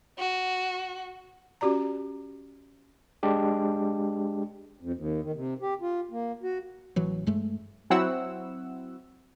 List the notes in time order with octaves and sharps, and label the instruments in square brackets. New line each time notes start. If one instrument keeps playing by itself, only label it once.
[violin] F#4
[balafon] C#4 F#4 G4 D5 A#5
[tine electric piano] G#3 D4 G4
[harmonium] F2
D#2
D#3
C3
G4
F4
A#3
F#4
[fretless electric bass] A1 E3 F#3
G2 G#3 A3
[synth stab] F#3 C4 E4 F#4 F#5 E6